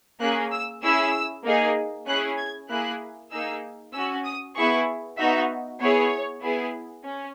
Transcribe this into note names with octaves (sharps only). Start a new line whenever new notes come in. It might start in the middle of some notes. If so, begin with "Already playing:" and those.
A#3 C#4 G#4 F#6
E6
C#4 E4 G#4 E6
A#3 D#4 G#4
C#4 E4 G#4 F#6
G#6
A#3 E4 G#4 F#6
A#3 D#4 G#4 E6
C#4 F#4 E6
D#6
B3 E4 G#4 C#6
B3 D#4 F#4 E5
B3 E4 G#4 C#5
B3 E4 G#4
C#4